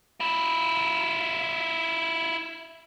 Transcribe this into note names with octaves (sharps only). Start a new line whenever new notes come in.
E4 F4